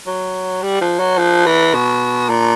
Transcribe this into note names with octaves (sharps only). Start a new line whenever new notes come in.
F#3
G3
F3
F#3
F3
E3
B2
A#2